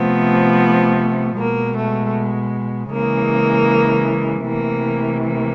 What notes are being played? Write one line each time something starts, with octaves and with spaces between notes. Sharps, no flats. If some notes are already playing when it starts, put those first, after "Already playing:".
Already playing: C3 F3 A3 B3
B2 G#3 A#3
A3
C#3 E3 G#3 A#3
C3 E3 A3 A#3
A#3